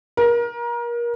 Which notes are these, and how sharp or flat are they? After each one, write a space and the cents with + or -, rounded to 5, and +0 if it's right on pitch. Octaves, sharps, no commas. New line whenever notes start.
A#4 +30